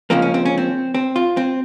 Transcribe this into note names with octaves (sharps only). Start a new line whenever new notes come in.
C#2 C#3 F3 A#3 C4
C#4
C4
C#4
C4
C4
F4
C4